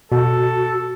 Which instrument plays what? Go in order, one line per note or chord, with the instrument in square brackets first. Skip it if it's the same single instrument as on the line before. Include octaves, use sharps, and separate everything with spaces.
[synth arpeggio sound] B2 [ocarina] F#4 [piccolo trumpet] A4